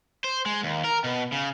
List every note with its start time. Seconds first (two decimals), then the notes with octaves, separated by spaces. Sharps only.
0.24 C5
0.46 G#3
0.63 D#2
0.84 A#4
1.04 B2
1.32 C#3